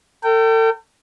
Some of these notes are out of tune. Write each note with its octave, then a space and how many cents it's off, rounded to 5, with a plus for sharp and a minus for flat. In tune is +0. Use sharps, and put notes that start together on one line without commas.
A4 +40 G5 -20